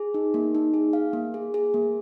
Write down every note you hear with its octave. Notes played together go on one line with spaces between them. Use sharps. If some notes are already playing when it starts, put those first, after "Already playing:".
Already playing: G#4
D#4
A#3
D#4
G#4
F5
A#3
G#4
G#4
A#3